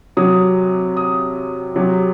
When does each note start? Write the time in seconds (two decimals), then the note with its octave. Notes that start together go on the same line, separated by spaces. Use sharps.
0.17 C3 F#3 D#6
0.97 D#6
1.76 C3 F#3